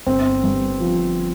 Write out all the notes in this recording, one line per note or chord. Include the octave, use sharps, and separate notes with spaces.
G1 C4
G2
F3